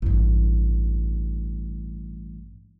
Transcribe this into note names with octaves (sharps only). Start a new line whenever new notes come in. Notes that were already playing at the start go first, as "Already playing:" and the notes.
A1 G2